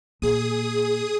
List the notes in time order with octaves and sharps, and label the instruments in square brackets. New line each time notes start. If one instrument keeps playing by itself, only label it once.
[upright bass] A#2 [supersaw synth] G#4 D#6